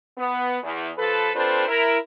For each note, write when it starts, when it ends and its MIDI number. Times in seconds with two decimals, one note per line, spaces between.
0.18 0.57 59
0.63 0.89 40
0.98 1.29 53
0.98 1.29 69
0.98 1.29 71
1.35 1.65 60
1.35 1.65 62
1.35 1.65 65
1.35 1.65 69
1.35 1.65 71
1.35 1.65 72
1.68 1.96 64
1.68 1.96 70